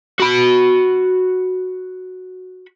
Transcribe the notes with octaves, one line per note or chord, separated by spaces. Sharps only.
F#4 B5